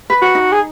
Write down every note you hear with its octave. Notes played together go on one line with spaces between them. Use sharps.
B4
F#4
D#4
G#4